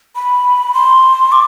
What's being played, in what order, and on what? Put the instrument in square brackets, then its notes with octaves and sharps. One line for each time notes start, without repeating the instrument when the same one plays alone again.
[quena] B5
C6
D6